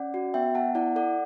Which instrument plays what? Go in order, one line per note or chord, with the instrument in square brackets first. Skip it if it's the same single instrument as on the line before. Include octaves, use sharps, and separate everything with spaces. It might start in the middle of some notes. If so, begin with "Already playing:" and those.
Already playing: [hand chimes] C#4 D5 F#5
F#4
B3 E5 G5
B3 F#5 A5
E4 D5 F#5
A4 D5 F#5